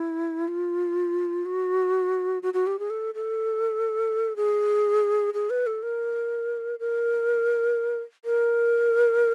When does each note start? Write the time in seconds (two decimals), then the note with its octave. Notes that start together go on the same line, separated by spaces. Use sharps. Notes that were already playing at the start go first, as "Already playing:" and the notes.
Already playing: E4
0.48 F4
1.45 F#4
2.43 F#4
2.54 F#4
2.67 G4
2.79 G#4
2.90 A4
3.15 A4
4.36 G#4
5.34 G#4
5.50 B4
5.67 A4
5.83 A#4
6.79 A#4
8.25 A#4